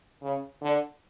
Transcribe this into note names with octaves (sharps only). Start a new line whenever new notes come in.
C#3
D3